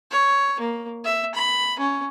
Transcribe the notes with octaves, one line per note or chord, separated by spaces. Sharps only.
C#5
A#3
E5
B5
C#4